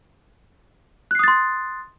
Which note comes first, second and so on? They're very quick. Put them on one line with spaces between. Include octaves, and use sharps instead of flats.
F#6 C7 D#6 A6 C6